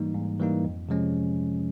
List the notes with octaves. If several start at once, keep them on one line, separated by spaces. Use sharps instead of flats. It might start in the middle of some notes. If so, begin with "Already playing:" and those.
Already playing: G#2 E3 G3 A#3 D#4
G#2
E3 G3 A#3 D#4
F2
C3 F3 G#3 C#4